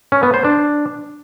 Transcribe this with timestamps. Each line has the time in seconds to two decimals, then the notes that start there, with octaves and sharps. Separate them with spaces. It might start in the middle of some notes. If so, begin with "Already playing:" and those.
0.12 C#4
0.23 B3
0.34 C5
0.45 D4